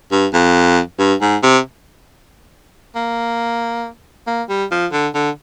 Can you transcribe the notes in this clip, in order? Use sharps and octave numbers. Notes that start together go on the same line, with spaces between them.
G2
F2
G2
G#2
C3
A#3
A#3
G3
F3
D3
D3